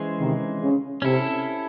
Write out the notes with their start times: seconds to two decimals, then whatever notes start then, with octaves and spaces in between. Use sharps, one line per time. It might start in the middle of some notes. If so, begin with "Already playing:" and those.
Already playing: E3 G#3 C#4 G#4 C5
0.19 C3 D#3
0.61 C#3
1.02 C3 C#4 E4 A4